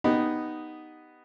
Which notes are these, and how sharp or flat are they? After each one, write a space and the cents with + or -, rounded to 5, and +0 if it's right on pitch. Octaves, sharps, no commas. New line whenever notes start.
B3 +0 D#4 -5 G4 +0